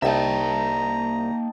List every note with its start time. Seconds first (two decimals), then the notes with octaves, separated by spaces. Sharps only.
0.02 C2 A#3 D#4 E5 G5 A5 A#5